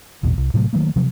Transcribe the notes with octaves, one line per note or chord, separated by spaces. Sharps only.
A1 E2 B2
C2
A2 C3 F#3 A3
D#3 F#3 A3 A#3
C3 F3 F#3